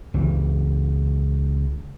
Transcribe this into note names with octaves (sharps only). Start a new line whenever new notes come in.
C#2 E3